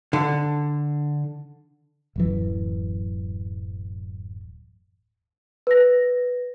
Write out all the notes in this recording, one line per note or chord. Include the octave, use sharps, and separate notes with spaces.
D3
D1 F#2 E3
B4 A#6